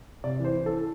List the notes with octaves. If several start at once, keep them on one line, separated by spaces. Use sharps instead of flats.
C3 D5
E3
C5
E3
A4